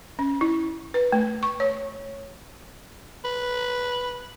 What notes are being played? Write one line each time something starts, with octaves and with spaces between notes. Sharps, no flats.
C#4
E4
B4
A3
C#6
C#5
B4